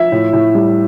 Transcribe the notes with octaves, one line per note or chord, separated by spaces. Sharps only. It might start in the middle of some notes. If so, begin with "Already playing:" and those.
Already playing: F3 E5
A2
A2
G3